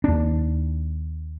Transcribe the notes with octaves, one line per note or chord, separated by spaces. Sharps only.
D#2 D4